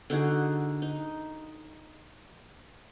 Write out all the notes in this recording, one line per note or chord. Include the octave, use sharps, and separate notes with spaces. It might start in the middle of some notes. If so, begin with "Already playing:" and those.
D3 D#4 F#4 G#4
D#4